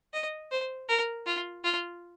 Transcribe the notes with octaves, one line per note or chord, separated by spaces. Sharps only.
D#5
C5
A#4
F4
F4